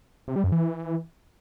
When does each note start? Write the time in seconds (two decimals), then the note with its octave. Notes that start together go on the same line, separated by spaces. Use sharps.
0.28 C3
0.36 G3
0.44 F#2
0.52 E3